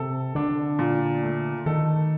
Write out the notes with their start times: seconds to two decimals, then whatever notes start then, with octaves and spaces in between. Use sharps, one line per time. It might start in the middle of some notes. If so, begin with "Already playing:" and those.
Already playing: C3 A4
0.35 D3 D4
0.79 A#2
1.23 A3
1.66 D#3 A4